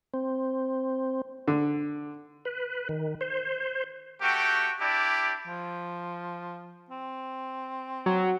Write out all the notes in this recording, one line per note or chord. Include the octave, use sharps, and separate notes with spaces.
C4
D3
B4
D#3
C5
A3 F#4 G4 G5
D4 E4 G4 D5
F3
C4
F#3